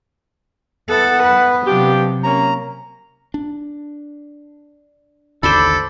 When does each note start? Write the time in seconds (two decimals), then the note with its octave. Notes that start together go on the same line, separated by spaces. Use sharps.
0.89 B3 E4 A4 F#5
1.23 B4
1.66 C3 F#3 D4 F4 G4
2.24 A#3 C#4 A#5
3.34 D4
5.43 A1 D#2 D3 A4 C5 D5 B5